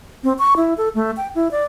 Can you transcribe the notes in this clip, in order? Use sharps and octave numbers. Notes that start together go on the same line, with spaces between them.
C4
C#6
E4
A4
A3
G5
E4
D5